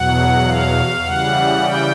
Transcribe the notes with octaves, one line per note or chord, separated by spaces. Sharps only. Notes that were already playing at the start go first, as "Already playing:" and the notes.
Already playing: E2 B2 F#3 F#5
F5
C#3 E3 G3 F#5
G5